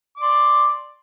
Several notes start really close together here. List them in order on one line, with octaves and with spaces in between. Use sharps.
D6 D5 C6